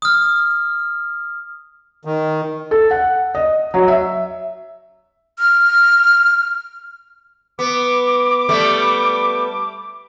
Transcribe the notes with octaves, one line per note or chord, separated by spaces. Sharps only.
D#6 F6
D#3
A4
F#5
D#5
F#3
E5
F6
B3 D6
G3 A3 B3